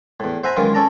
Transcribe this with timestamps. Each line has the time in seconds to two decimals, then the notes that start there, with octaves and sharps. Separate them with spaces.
0.20 E2 A2
0.43 C5 E5 F#5 G#5 A#5 B5
0.56 C#2 F#2 D#3 E3 F4
0.74 C#4 A4 D5 A5 A#5